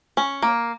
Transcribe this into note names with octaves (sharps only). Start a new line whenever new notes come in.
C#4
A#3